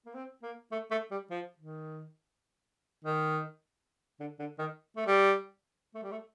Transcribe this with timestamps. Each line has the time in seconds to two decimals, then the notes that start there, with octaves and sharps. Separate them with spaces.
0.06 A#3
0.14 C4
0.43 A#3
0.72 A3
0.91 A3
1.11 G3
1.31 F3
1.58 D#3
3.05 D#3
4.20 D3
4.39 D3
4.59 D#3
4.96 A3
5.07 G3
5.95 A3
6.03 G3
6.12 A3